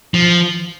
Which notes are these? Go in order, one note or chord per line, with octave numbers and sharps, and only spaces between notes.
F3